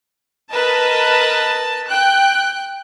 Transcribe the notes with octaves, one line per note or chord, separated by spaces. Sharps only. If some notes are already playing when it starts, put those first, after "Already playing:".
A#4 B4 D#5 A5
G5 F#6